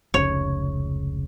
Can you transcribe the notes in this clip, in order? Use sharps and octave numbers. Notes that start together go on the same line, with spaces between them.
F1 C#2 C#3 C#5